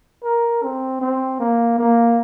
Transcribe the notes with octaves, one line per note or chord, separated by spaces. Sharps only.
A#4
C4
C4
A#3
A#3